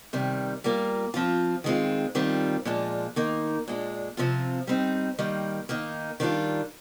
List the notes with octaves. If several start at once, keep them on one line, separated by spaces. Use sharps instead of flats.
C3 D#3 G3
G3 A#3 F4
F3 C4 F4
D#3 G#3 C4 F4
D#3 G3 C4 F4
A#2 F3 G#3 D4
D#3 A#3 D#4
A#2 G#3 D4
C3 F3 C4 F4
G3 C4 D#4
D#3 G3 A#3
D#3 A#3 D#4
D#3 G3 D4 F4